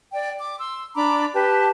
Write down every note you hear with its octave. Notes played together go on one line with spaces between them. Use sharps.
D5 G5
D6
C6 E6
D4 A#5 B5 D6
G4 B4 A5